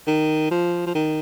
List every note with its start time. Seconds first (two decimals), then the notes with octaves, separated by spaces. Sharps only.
0.07 D#3
0.51 F3
0.86 F3
0.95 D#3